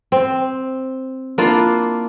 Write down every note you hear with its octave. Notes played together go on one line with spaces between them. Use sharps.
C4
A#3 D4 E4 F4